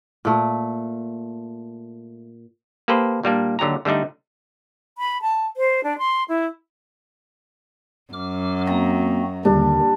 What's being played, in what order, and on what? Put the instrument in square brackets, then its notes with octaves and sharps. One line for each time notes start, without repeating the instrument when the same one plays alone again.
[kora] A#2 A3
[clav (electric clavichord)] A#3 G4 A4 B4 C5
A#2 G3 A#3 D4
D#2 D3 F#3 G4 A#5
D3 G3 A3 D4 D#4
[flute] B5
A5
C5
D4
C6
E4
[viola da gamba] F#2 [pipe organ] D6 F6
[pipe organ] A#3 C4 F#4 [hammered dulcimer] A#5
[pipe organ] D#2 D3 D#3 [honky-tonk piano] A#2 G3 [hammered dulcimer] D4